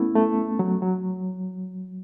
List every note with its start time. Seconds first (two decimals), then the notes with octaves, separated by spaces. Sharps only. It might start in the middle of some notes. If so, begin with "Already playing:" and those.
Already playing: A3 B3 C#4 E4
0.15 A3
0.59 F#3
0.82 F#3